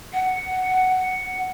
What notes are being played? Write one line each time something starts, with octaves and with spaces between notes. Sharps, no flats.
F#5